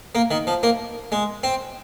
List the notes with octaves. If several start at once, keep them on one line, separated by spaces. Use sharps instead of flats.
A#3
D#3
F3
A#3
G#3
C4